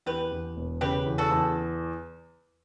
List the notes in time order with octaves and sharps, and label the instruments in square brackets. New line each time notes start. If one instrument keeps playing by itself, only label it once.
[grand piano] E2 [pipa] G4 B4
[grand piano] E2
E1
[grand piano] C#3 [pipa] G4 B4
[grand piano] E2
[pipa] F#4 A4
[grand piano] E2